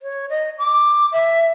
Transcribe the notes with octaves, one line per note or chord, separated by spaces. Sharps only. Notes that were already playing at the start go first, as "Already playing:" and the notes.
C#5
D#5
D6
E5